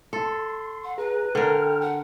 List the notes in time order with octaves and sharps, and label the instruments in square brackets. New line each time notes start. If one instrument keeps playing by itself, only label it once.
[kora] A4 [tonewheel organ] C6
[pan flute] F#5
[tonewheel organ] G#4 A#5 [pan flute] B4
[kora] D3 A#4 [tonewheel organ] A4 G5 F6
[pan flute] F#5